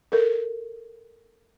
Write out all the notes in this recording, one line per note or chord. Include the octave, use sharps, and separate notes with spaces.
A4 A#4